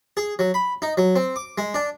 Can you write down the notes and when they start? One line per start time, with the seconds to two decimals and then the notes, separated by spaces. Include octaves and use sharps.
0.17 G#4
0.39 F#3
0.54 B5
0.82 D#4
0.97 F#3
1.16 C4
1.36 D6
1.58 G#3
1.74 D4